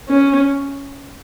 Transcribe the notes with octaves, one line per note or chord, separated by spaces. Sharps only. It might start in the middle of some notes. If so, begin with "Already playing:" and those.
C#4